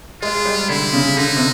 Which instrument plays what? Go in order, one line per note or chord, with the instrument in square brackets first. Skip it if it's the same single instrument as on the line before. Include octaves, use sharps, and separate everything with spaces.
[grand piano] G#3 [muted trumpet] F4
[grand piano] G3
[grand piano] D3 [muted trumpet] E4
[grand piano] C#3
[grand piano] D3 [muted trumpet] D#4
[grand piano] C3